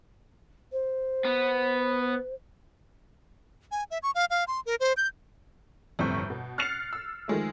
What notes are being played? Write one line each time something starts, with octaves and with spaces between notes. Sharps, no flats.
C5
B3
G#5
E5
C#6
F5
F5
C6
A#4
C5
G6
G1 F2 A2 C4 C#6 G6
B2
F6 F#6 A6 C7 C#7 F7
E6
D#3 F3 G#3 A3